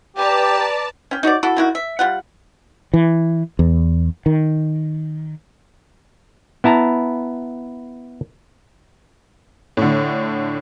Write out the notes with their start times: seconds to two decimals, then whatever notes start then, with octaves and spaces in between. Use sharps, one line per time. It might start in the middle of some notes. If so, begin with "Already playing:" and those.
0.17 G4 B4 D5 A5 A#5
1.11 C#4 G5
1.23 D#4 F#4 C#5 D5
1.43 E4 F#4 A4
1.57 D#3 E4 F#4
1.75 E5
1.99 G3 F4 F#5
2.94 E3
3.59 E2
4.26 D#3
6.64 B3 E4 A5 A#5
9.77 A2 D3